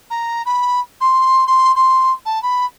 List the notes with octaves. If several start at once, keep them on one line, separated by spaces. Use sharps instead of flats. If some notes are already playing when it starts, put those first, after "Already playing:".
A#5
B5
C6
C6
C6
A5
B5